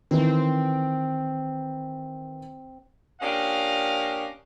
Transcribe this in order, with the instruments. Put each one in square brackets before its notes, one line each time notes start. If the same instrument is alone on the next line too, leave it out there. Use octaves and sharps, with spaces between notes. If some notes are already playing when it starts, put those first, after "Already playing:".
[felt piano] D#3 E3 [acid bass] C4
[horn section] A#2 C#4 D4 G4 D#5 F5